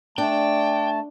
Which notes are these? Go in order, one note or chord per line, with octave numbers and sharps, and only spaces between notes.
A3 D4 G5 A5